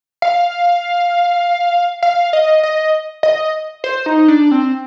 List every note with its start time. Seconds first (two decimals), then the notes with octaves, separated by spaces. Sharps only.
0.22 F5
2.03 F5
2.33 D#5
2.63 D#5
3.23 D#5
3.84 C5
4.06 D#4
4.28 D4
4.51 C4